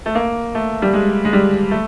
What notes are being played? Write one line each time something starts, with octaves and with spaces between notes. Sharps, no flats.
A3
A#3
A3
G3
G#3
G#3
G3
A3